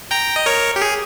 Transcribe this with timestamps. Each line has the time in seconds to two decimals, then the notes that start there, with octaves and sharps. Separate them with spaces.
0.11 G5 A#5
0.36 D#5
0.46 A#4 C#5
0.76 G4
0.82 G#4